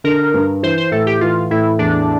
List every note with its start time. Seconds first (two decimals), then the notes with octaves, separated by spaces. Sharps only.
0.04 D3 A#4
0.34 G2
0.63 E3 C5
0.78 C5
0.91 A2 A4
1.07 G4
1.21 E3 F4
1.51 A2 E4
1.79 E2 D4